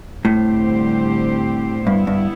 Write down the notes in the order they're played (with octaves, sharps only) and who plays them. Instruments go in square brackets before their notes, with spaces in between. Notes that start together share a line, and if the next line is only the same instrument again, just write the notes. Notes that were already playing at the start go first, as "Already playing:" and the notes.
[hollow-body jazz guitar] A2 [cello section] D3 G3 C4 G4 C5
[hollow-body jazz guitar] G2 [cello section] G3 B3 E4
[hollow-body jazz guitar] G2